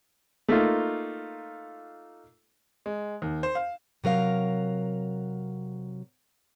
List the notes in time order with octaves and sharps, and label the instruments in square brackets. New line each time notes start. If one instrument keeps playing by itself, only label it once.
[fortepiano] A3 A#3 D#4 F4
[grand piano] G#3
D#2
C5
F5
[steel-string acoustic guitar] C3 F#3 A#4 F5